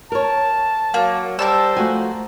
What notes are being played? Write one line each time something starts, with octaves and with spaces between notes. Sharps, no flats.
A#4 C#5 A5
F#3 A#3
G3 A#4 C5 A5 E6
F3 A3 F#4 G#5